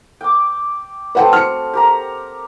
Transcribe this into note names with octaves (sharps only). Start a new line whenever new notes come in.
G5 D6
A3 C4 F#4 B4 F#5 G5
F6 C#7
G4 A#4 A#5